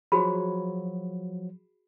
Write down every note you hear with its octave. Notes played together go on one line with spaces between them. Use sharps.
F3 F#3 F#4 G#4 B5